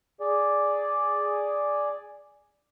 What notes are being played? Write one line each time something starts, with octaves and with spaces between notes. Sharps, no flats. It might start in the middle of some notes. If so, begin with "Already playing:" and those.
G#4 D5